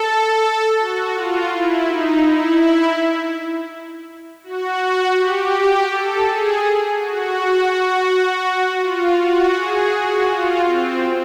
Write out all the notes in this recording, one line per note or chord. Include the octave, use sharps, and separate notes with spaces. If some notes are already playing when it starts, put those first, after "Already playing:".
Already playing: A4
F#4
F4
E4
D#4
E4
F#4
G4
A4
G#4
F#4
F4
F#4
G#4
F#4
F4
C4